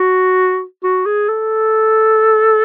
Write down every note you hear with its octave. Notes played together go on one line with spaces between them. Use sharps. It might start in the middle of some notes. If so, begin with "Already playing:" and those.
Already playing: F#4
F#4
G#4
A4